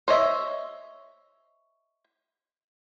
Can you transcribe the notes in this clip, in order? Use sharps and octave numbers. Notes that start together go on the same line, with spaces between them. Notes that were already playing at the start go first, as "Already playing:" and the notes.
C5 C#5 D#5 E5